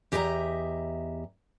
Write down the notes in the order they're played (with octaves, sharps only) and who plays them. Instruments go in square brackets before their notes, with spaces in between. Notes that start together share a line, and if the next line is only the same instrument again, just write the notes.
[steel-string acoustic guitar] E2 G4 D#5 E5 G#5 A#5